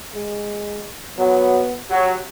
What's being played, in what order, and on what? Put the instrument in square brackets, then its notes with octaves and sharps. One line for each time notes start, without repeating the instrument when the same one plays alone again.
[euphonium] G#3
[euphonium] F#3 [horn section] B3
[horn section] F#3 [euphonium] G4